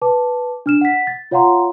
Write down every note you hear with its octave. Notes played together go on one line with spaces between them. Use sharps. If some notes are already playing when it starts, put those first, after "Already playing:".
B4 A5 D6
D4 F6 E7
F#5 B6
A6
F4 C#5 F5 F#5 A#5 C6